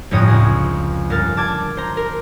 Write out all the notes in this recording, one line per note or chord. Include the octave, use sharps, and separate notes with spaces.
G1 F2 A2 C#5 D#6 A#6
C#2 G#4
G1 A#4 F6 A6
A5 D6 G#6
C5 A#5
A#4